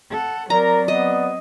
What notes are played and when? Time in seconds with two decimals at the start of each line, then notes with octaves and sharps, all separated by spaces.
0.10 A4 F#5
0.50 F#3 C4 A#4 D5 A#5
0.88 B3 D#5